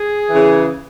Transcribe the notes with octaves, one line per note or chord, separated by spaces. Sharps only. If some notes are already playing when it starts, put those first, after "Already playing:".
Already playing: G#4
C#3 E3